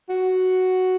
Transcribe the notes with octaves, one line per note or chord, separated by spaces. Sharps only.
F#4